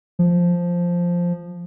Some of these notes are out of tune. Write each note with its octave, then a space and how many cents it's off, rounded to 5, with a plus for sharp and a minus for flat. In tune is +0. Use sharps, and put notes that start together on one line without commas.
F3 +0